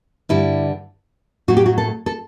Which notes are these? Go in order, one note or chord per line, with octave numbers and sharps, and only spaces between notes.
G2 D3 G3 E4
A2 F#3 F#4
G4
F#4
A4
A4